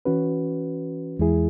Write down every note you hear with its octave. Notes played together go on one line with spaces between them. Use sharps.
E3 C#4 F#4 B4
E2 E3 G#3 E4 G#4